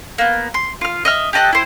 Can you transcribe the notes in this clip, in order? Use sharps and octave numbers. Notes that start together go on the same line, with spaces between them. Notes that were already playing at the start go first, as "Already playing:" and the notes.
A#3 B3
C6
F4 F6
D#5 E5 F6
G4 A4 D#5 F#6
E4 C5